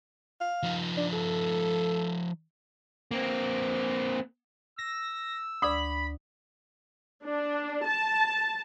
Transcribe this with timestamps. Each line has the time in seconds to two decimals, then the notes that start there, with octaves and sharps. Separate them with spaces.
0.41 F5
0.63 F3 D#4
0.97 D4
1.13 A4
3.11 A#3 C4
4.78 E6 A#6
5.62 D2 D5 B5 D6 D#6
7.24 D4
7.85 A5